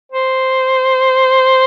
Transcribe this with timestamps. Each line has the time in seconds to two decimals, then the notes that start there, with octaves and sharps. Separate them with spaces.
0.12 C5